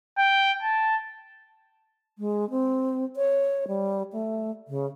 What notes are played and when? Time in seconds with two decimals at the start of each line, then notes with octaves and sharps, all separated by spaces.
0.18 G5
0.63 A5
2.19 G#3
2.50 C4
3.17 C#5
3.68 G3
4.13 A3
4.68 C#3